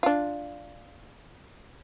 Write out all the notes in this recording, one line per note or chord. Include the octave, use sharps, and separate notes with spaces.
D4 F4